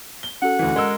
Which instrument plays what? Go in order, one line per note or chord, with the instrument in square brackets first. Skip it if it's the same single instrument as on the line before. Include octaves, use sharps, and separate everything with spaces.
[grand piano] G7
[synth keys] C#4 F#4 A4 [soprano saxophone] F#5
[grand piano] D2 E3
G#3 A#4 E6